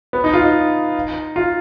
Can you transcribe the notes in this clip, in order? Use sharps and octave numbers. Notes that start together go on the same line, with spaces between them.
B3
D#4
F4
D#4
F4